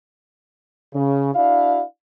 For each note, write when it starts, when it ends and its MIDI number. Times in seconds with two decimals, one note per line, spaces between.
0.94 1.31 49
1.35 1.83 62
1.35 1.83 64
1.35 1.83 66
1.35 1.83 74
1.35 1.83 77